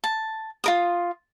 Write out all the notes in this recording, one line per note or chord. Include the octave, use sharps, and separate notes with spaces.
A5
F4 A#4 D#6